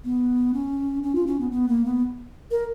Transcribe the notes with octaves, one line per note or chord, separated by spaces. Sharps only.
B3
C#4
C#4
F4
C#4
B3
B3
A#3
B3
A#4